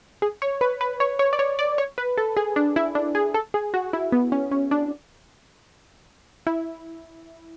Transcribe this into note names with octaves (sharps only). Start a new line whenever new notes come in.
G#4
C#5
B4
B4
C#5
C#5
D5
C#5
D5
C#5
B4
A4
G#4
D4
E4
D4
G#4
A4
G#4
F#4
E4
B3
C#4
C#4
D4
E4